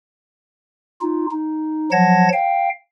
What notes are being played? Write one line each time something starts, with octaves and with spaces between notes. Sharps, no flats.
D#4 F4
D#4
F3 F#3 F#5 A5 G#6 A#6
F5 G5